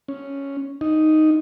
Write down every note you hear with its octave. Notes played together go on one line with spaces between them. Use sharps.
C#4
D#4